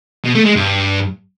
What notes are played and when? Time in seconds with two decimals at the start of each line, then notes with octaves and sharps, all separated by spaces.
0.24 B2
0.35 A3
0.45 G#3
0.56 G2